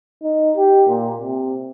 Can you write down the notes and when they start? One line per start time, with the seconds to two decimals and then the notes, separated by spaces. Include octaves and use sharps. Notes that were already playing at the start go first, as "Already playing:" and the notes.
0.22 D#4
0.56 G4
0.88 A#2
1.21 C3